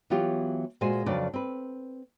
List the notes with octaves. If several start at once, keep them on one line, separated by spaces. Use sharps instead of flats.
E3 F#3 B3 F4 G4
A#2 G#3 F4 F#4 C5 G#5
F2 C#3 F#3 D4 B4 D5
C4 B4